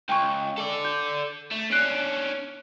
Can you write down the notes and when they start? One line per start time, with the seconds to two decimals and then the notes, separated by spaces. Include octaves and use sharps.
0.09 C#2 G5 G#5 C#6
0.58 A4 D5
0.85 G6
1.51 A3
1.72 C#4 D4 F#6 C7 D7